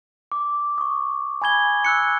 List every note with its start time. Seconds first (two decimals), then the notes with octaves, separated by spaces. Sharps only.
0.32 D6
0.78 C#6 D#6
1.42 G#5 B5 G#6 G7
1.85 E6 F#6 C#7